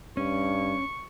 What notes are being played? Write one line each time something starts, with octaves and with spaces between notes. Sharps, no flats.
G2 C#4 C#6